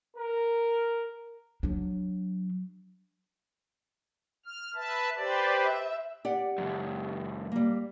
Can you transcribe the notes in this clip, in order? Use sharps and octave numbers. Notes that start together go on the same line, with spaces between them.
A#4
F#3 D4
F6
B4 E5 A5
G4 B4 C5 D5
E5
G4 D5 F#5
C#2 F#2
G3 A#3